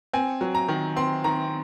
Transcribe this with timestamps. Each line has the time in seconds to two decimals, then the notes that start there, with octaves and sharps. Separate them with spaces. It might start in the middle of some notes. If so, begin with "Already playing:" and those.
0.13 C4 G#5
0.41 F#3
0.55 A#5
0.68 D#3
0.96 C4 C6
1.24 D#3 A#5